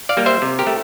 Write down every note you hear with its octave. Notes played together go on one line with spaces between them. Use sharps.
D5 F5
G3 A#3
C5 E5
C3
G4 A#4
A3